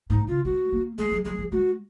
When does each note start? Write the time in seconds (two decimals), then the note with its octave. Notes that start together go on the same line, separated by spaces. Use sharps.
0.10 G#2 D#4
0.27 C#3 F4
0.45 G#3 F#4
0.73 A#3
0.98 G#3 G#4
1.12 F#3
1.25 F#3 G#4
1.38 F3
1.52 G#3 F#4